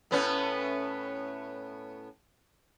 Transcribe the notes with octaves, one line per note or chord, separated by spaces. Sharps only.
A2 B3 C#4